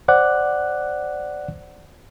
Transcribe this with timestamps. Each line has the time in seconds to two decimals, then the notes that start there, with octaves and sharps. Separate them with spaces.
0.08 C5 D5 F#5 D6 F#6